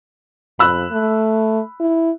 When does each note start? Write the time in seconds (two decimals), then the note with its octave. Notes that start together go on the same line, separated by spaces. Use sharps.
0.59 F2 B5 E6 F#6
0.92 A3
1.80 E4